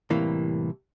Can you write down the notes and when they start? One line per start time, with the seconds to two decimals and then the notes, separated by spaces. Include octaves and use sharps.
0.10 C2 A2 C3 E3 A#3